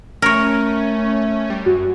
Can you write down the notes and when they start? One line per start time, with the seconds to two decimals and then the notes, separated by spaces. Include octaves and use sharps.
0.22 A3 C#4 A#4 C#5
1.50 G3
1.66 F#2 F#4